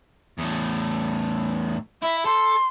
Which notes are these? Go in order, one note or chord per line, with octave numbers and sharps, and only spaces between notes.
E2 A2
E4 E5
A4 C6